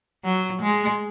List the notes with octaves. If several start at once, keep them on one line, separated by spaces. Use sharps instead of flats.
F#3
G#3